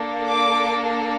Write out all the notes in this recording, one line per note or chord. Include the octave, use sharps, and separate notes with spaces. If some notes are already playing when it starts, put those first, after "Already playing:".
Already playing: A#3 D4 A4
D6